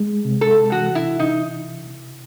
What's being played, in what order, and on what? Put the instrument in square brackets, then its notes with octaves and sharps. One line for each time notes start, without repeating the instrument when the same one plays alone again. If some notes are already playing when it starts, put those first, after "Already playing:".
Already playing: [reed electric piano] G#3
C3
[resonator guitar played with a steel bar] A4
[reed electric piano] E3 [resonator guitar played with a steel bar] F#4
[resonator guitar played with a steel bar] E4
[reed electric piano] C3 [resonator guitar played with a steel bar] D#4